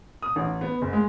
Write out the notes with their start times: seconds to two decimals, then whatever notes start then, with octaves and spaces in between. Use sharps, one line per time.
0.22 D#6
0.36 A1
0.61 B3
0.82 F#1
0.93 G#3